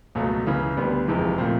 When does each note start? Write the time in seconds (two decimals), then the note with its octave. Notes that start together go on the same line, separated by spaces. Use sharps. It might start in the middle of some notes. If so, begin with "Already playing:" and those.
0.15 C#2 B2 F#3 A3
0.46 C#2 C#3 E3
0.77 D2 D3 G3 B3
1.07 F#1 F2 C3 E3 G#3
1.38 A#2 F3 A3 C4